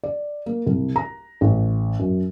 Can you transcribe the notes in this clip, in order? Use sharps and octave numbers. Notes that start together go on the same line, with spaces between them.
D5
A#3
C2
A#5
A1
F#2